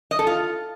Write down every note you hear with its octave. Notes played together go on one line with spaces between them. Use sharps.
D#5
A4
F4